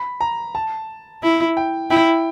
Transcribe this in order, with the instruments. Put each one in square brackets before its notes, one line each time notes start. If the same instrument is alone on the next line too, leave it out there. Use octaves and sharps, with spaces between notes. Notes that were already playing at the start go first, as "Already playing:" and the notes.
Already playing: [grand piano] B5
A#5
A5
[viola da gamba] E4
[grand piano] G5
[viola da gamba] E4 [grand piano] G5